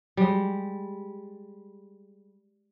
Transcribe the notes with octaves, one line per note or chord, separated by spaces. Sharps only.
G3 G#3